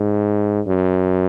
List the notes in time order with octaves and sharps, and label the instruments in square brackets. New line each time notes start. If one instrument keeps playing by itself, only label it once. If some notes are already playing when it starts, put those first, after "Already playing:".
Already playing: [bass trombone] G#2
F#2